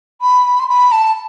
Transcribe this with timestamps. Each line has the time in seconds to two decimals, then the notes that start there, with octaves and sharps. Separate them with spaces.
0.21 B5
0.59 C6
0.69 B5
0.92 A5